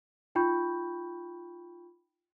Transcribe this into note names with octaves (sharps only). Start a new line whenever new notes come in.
D#4 F4 G5 B5 C#6 G6